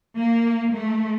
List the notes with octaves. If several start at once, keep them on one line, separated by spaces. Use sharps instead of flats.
A#3
A3